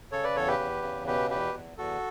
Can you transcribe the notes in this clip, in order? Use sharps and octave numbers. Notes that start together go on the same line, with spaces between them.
C#3 A4 C#5
B4 D5
E2 A4 C#5
G4 B4
E2
C#3
B2 G4 B4
E2 G4 B4
E2
E2 F#4 A4